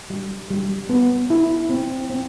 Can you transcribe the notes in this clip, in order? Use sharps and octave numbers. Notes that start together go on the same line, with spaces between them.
G3
G3
B3
E4
C4
C4